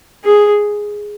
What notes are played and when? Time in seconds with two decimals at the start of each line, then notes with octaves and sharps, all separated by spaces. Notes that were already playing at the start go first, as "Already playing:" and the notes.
0.25 G#4